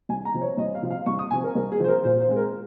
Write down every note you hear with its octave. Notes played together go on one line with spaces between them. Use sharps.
C2 G#5
A#5
C3 F3 C4
C#5
C2 D#5
F5
C3 F3 C4
F5
C2 C#6
D#6
C3 F3 C4 G#5
A#4
C2 A#4
G#4
C3 F3 C4 C5
A#4
A#2 C5
C5
G#3 C4
A#4